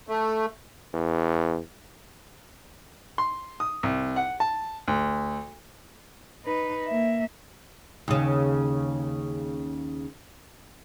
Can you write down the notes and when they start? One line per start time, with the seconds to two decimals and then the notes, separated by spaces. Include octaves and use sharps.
0.08 A3
0.94 E2
3.18 C6
3.60 D#6
3.83 C2
4.16 F#5
4.40 A5
4.88 D2
6.44 D#4 B4
6.87 A#3 E5
8.08 D#2 C#3